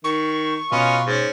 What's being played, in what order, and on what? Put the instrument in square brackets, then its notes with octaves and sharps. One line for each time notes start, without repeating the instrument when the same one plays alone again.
[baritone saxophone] D#3 [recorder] C#6
[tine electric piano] B2 [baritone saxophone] C#4 [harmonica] F4 B4 D#5
[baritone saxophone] G#2 [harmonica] C#4